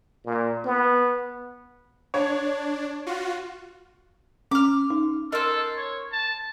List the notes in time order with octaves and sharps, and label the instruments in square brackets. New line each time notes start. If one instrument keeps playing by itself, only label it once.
[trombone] A#2
B3
[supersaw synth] D4 [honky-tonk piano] C#5
[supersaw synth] F4 F#4
[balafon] C#4 [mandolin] D6 F6
[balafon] D#4
[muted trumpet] A4 [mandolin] A#4 C5 [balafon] D#5
[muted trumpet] C#5
A5